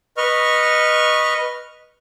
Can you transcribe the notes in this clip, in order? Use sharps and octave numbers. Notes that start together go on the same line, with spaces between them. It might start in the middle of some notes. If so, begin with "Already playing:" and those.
B4 D#5 C#6 F6